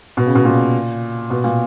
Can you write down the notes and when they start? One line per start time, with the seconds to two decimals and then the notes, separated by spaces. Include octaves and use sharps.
0.17 B2
0.26 C#3
0.35 B2
0.45 A#2
1.30 B2
1.44 A#2